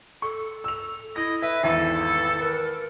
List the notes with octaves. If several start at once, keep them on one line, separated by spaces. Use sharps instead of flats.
A4 C#6
E6 F7
E4 D#5 A#6
B4 E5
G#1 E2 E4 A4
A#4 B4